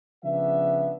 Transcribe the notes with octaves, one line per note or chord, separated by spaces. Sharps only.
C#3 F3 B3 D4 E5